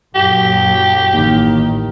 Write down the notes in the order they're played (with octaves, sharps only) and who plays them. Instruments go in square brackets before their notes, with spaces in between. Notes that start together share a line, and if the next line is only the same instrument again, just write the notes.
[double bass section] F#2 A#2 F#3 [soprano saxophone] G4
[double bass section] A1 D#3 [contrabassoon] D#2